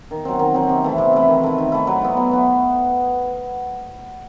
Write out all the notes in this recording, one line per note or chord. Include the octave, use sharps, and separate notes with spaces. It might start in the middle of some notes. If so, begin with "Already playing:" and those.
D#3
F#3 C4
D#3
F#3 C4
C3
E3 A3 E4
C3
E3 A3 E4
D#3
A3 E4
D#3
A3 E4
F#3
B3 E4
F#3
B3 E4